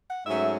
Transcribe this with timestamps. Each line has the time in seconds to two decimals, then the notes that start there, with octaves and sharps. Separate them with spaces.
0.10 F#5
0.26 G#2 F#3 A3 C#4 E5